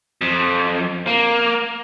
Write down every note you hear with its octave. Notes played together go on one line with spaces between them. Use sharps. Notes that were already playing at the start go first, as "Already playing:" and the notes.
F2
A#3